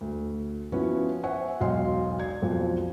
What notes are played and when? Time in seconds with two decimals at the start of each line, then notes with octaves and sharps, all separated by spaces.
0.01 D2
0.72 F3 B3 C#4 E4 F#4
1.24 C5 E5 F#5 G#5 C#6
1.60 E1 B1 D#5 F5 C6
2.19 D5 G#6
2.42 B1 F2 F3